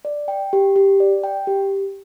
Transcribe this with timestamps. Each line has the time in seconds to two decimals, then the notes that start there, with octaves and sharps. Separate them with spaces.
0.05 D5
0.28 G5
0.53 G4
0.76 G4
1.00 D5
1.24 G5
1.47 G4